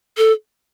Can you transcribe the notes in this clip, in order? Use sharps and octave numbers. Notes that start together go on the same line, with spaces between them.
A4